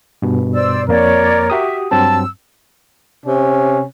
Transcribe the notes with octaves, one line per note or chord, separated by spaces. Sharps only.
G2 B2
C5 D5 E6
F2 A#3 A#4 C#5 D5
F#4 G4 E5 D#6
G2 F#3 C4 A5 E6
C3 C#4